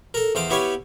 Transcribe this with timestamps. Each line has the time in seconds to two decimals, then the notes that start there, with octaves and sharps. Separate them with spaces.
0.14 A4 A#4
0.35 E2 C5 F5 D6
0.50 B3 E4 G4 C#5 F5 G#5